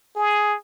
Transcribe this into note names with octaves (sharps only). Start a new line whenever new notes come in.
G#4